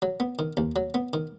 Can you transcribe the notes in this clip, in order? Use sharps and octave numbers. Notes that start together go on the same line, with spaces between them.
F#3
B3
D#3
D#2
F#3
B3
D#3